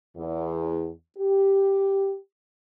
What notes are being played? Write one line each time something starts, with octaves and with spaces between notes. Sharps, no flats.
E2
G4